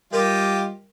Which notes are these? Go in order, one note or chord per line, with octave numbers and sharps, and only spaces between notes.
G3 F4 G4 A#4 D#5